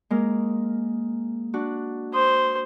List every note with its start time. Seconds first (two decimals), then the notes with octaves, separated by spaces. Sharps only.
0.10 G#3 A#3 A#4
1.54 D4 F#4
2.14 C5 D#6